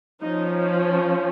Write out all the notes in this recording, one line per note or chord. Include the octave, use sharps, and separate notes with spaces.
F3 C#4 D#4